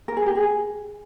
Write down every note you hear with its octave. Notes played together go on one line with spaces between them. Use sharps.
A#4
G#4
G4
G#4